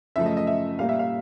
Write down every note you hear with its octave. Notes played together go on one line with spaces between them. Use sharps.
F#2 C#3 F3 A3 E5
D#5
D#5
E5
A#2 G3 A#3 F5
E5
F5